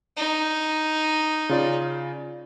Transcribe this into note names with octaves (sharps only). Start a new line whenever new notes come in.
D#4
C#3 F4 D5